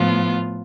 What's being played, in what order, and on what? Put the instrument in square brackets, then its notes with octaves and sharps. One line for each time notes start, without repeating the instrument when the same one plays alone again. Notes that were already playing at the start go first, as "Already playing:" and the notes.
Already playing: [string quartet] A2 F3 B3 F4